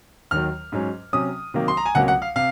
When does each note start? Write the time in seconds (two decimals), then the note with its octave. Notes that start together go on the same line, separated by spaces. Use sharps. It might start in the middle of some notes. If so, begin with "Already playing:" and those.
0.31 D#2 D#3 F#3 F6
0.72 G#2 F#3 C#4
1.13 C3 F#3 C#4 D#6
1.54 C3 D#3 F#3 A#3
1.68 C6
1.77 A#5
1.86 G#5
1.95 C#2 C3 F#3 A#3 C#4 F#5
2.08 F#5
2.22 F5
2.36 C3 F5